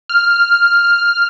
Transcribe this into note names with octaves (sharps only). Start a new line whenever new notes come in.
F6